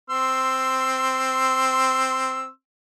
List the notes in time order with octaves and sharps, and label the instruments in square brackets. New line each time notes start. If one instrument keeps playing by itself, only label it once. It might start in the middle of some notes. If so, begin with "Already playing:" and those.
[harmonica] C4 C6 E6